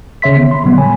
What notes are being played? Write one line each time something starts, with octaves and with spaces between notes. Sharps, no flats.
C#2 C#3 C#5 E5 C6 B6
D3 D#3 B3
B5 C6
A#2 D3 F#3 G3 B3
C#5 G#5 B5